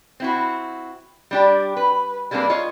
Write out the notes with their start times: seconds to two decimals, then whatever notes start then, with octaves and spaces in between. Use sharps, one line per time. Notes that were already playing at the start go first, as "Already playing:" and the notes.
0.20 C4 E4 F#4
1.31 G3 D4 G4
1.77 B4
2.31 G3 G#3 A#3 C4 D4 B4
2.49 F4 C#5 D#5